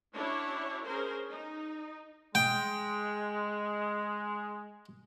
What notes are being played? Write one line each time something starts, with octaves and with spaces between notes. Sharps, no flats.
C#4 D4 E4 F#4 C#5
C#4 G#4 A#4 C5
D#4
G#3 G5